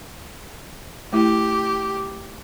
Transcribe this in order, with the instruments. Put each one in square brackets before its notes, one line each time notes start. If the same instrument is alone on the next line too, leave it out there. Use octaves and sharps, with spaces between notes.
[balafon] A3 E4 [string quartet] G4